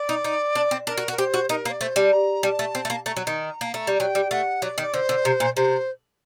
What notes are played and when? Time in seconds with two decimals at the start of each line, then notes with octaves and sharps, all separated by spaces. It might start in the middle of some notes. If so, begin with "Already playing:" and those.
Already playing: D5
0.09 D#4
0.24 D#4
0.55 D4
0.71 C4
0.87 D4 A#4
0.97 F#4
1.08 F#4
1.12 A#4
1.18 G4 C5
1.34 F#4
1.49 D#4 A#4
1.65 A#3
1.70 D5
1.81 A3 C5
1.96 G3 A5
2.12 A#5
2.43 G3 A5
2.59 A3
2.75 C4
2.85 A3
2.90 A#3
3.05 A3 A#5
3.17 F#3
3.27 D#3
3.61 A#3 A5
3.68 A#5
3.74 A3
3.87 G3
4.00 F#3 G5
4.15 G3
4.31 A3 F#5
4.62 F#3 D5
4.78 D#3
4.81 D5
4.93 D3 C5
5.09 D3
5.25 C3
5.40 A#2
5.56 C3 C5